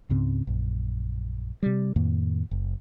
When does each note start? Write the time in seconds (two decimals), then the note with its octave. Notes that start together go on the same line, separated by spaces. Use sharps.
0.09 C#2 G#2 C#3 C4
0.47 A#1 F#2
1.63 C3 G3
1.96 F2 A2 D#3 A#3
2.51 F#1